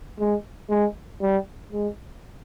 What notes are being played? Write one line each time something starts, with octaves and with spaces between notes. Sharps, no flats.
G#3
G#3
G3
G#3